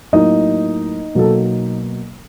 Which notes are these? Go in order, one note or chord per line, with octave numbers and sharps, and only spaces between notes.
A2 F#3 A#3 D#4 D#5
B2 F#3 A#3 A4